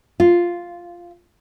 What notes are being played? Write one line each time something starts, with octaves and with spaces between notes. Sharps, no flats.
F4